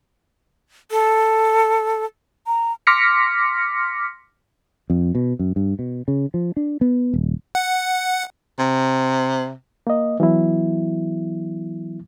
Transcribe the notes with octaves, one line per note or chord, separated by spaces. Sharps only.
A4
A#5
C6 D6 F6 A#6 B6 C#7
F2
B2
F#2
G2
B2
C#3
F3
D4
B3
D#1
F#5
C3
A#3 D#5
E3 F#3 B3 E4